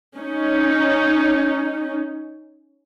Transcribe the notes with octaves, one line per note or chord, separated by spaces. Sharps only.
C#4 D#4